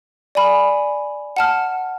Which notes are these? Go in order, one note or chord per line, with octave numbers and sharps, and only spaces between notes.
D5 G#5 B5
F#5 A5 F6